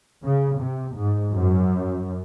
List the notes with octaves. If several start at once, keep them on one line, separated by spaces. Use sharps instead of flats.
C#3
C3
G#2
F#2